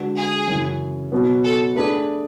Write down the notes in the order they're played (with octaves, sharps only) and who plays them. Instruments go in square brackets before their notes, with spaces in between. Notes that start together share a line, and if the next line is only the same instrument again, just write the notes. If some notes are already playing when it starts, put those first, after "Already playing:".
Already playing: [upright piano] D3 G#3 D4 F#4 B4
[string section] G#4
[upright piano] F#2 C#3 E3
B2 F#3 B3
[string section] A4
[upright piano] A3 D4 G#4 D5 [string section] B4